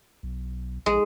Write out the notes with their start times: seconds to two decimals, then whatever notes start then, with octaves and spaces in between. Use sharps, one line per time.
0.23 B1
0.86 A#1 G#3